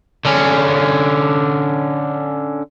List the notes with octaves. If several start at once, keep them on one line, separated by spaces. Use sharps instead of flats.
D3 C#4